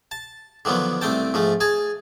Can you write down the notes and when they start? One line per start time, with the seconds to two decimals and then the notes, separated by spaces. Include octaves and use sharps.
0.11 A5
0.65 D3 D#3 F3 F#3 B3
1.01 C2 A3 C4 G5 A5
1.34 G#2 F3 A3
1.61 G#4 G#5 A5